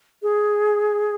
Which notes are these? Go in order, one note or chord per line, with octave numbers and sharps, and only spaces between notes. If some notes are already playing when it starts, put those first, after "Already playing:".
G#4